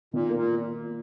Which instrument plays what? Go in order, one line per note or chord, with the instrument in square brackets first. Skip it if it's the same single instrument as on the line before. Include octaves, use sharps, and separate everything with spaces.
[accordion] A#2 [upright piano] D#3
[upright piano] A#3
[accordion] A#2